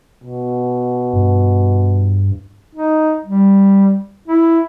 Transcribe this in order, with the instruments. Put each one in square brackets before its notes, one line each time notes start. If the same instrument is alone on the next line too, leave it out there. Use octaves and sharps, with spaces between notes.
[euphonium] B2
[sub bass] G2
[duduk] D#4
G3
E4